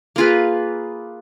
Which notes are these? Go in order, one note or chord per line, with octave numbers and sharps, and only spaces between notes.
A#3 F4 G#4 B4